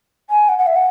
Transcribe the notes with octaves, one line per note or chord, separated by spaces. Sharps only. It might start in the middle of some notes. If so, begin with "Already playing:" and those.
G#5
F#5
F#5
E5
F#5